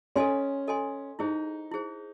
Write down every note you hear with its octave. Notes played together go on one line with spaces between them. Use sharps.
C#4 A4 D#5 G#5 C6
A4 D#5 G#5 C6
D#4 E4 G#4 C5
E4 G#4 C5